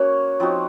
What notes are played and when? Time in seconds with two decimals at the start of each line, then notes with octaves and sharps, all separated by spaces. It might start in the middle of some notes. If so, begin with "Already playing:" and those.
Already playing: A#3 C#4 F#4 C#5
0.40 F3 C4 D#4 F#4